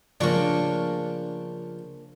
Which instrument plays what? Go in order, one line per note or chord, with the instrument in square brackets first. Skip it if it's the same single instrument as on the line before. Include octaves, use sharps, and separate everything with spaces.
[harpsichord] C#3 F3 C#6 [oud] A#3 D4